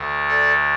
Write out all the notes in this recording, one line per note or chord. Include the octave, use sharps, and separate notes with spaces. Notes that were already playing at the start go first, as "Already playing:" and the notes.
Already playing: D2 D3
A4 D5